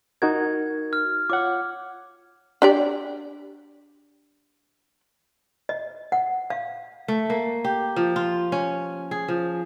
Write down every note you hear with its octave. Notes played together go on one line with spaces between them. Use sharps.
D#4 F#4 A#4 G#6
F6
F4 C#5 F#5 D6
D4 G4 D5
D#5
F#5
F5
A3
A#3
G4
F3
F4
C#4
G#4
F3